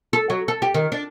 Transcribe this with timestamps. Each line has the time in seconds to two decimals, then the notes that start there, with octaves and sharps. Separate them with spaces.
0.13 A4
0.30 F#3
0.48 A4
0.62 G4
0.74 D#3
0.92 D4